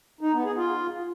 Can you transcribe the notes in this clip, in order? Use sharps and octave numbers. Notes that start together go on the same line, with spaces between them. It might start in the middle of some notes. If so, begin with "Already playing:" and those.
D#4
B3
G#4
F4